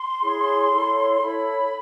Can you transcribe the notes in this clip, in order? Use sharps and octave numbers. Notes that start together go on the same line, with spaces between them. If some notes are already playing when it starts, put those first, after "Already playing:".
Already playing: C6
E4 G#4 C#5
E4 A4 C#5
E4 A4 C#5 B5